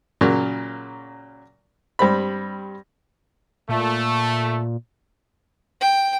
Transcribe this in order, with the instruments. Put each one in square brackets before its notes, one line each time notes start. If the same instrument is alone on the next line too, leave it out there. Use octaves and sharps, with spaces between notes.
[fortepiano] A#2 C#3 F#3
G2 G3 C4 B5
[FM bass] A#2 [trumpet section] A3
[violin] G5